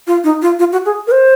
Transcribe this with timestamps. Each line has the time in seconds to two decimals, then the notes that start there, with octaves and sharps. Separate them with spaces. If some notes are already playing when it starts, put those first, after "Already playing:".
0.07 F4
0.24 D#4
0.42 F4
0.59 F4
0.72 F#4
0.85 G#4
1.07 A#4
1.12 C5